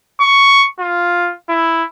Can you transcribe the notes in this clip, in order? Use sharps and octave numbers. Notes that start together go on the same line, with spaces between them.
C#6
F4
E4